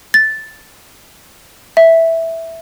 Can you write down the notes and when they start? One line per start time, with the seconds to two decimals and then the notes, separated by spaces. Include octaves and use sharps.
0.14 A6
1.77 E5